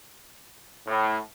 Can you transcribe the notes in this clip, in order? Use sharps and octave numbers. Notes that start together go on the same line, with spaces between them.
A2